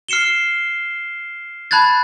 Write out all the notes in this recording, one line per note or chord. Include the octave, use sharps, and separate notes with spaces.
F6 C7 C#7 E7 G7
A5 B5 F#6 G#6 A6